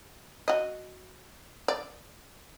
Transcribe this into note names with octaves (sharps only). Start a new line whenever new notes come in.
F#4 D#5
D5